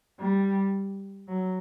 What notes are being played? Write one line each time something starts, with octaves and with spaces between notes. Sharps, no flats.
G3
F#3